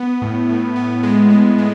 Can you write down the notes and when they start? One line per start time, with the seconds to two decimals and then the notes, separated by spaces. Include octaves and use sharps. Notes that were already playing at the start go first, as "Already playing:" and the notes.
Already playing: B3
0.22 A2
0.49 A2
0.76 B3
1.03 G#3
1.30 G#3
1.58 G#3